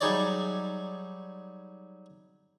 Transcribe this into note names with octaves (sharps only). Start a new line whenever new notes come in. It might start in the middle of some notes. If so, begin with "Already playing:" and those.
F#3 G3 D#4 G#4 C#5 D5